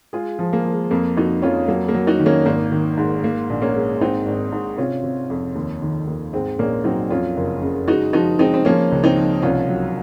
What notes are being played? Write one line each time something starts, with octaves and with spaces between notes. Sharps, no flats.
G#3 F4 G#4
F3
A#3
F3
G#3
F2 A#3
F2 D#4 F#4
F2 C#4 F4
F#3 A#3
A#3
F#3
D#4 F#4
D#3
A#3 C#4
G#1 A#3
D#3
G#2
G#3 A#3
A#1
A#3 C#4
G#3
G#2 C4 D#4
G#1
G#2
C3 C#4 F4
C3
F2
D#2
D#3
D#2
G#2 G#3 C4
A#1 A#3 C#4
F#3 C4 D#4
F2 C#4 F4
F#1
C#3
G#3 D#4 F#4
F3 D#4 F#4
G#3 C4 D#4
C4
F3 A#3 C#4
C#2
C4 D#4
F3
C2 C#4 F4
F#3